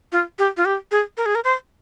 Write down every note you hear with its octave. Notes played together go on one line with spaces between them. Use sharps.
F4
G4
F4
G4
G#4
A#4
G#4
A#4
C5